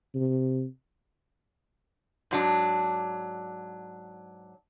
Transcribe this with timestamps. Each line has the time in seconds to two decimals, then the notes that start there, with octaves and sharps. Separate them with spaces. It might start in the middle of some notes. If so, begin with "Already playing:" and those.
0.15 C3
2.31 G#2 F#3 D4